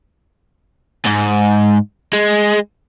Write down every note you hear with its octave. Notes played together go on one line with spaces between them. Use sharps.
G#2
G#3